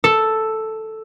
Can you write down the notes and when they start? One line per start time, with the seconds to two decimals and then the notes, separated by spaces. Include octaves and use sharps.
0.04 A4